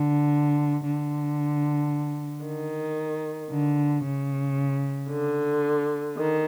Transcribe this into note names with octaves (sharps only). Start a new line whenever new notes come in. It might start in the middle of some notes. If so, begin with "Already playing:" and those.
Already playing: D3
D3
D#3
D3
C#3
D3
D#3